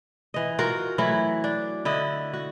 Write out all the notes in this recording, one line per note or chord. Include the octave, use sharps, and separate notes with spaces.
E3 D#5
F4 F#4 A#4
E3 F#3 A3 E4
D4
D3 E4 D#5
F#4